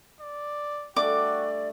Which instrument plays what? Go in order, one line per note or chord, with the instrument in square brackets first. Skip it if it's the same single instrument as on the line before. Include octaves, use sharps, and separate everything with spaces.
[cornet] D5
[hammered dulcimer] G3 A3 D4 [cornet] F#4 [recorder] D5 [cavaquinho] D6